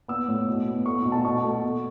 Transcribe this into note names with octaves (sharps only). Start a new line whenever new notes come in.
B3 E6
A2
B2
B3
A3 C#6
B2
A5
B2 C#6
A3
A3